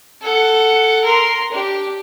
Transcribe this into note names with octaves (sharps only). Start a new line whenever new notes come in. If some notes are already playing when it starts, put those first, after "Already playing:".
A4 F#5
A#4 C6
D4 G4